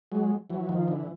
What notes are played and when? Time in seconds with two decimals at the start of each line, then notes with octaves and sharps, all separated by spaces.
0.12 F#3 G#3
0.50 E3 F#3
0.69 D#3 F3
0.88 D3 E3